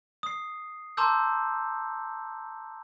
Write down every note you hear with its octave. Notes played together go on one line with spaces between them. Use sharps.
D#6 C7
A5 A#5 C6 D6 E6 G6